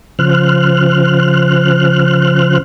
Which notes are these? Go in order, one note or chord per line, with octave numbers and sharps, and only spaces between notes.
C#3 F3 C5 F6 F#6